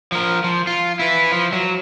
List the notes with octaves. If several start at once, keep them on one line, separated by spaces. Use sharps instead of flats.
F3 A#4
F3
F4
E4 B4
F3
F#3